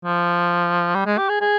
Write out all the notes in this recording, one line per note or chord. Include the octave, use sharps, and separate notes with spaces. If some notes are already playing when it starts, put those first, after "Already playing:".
F3
G3
G#3
G4
G#4
G#4